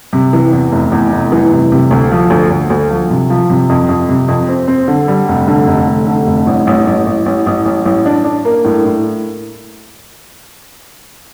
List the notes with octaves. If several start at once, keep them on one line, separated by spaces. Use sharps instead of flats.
C3
E3
E2
F1
E2
F1
E3
C3
C3
D2
F3
D2
D2
D2
F3
C3
F3
C3
F2
F2
C3
F2
C4
C4
D3
G3
F1
D3
F1
D3
D3
F1
A1
A1
A1
A1
A1
A1
A1
A1
D4
D4
A#3
A2
A2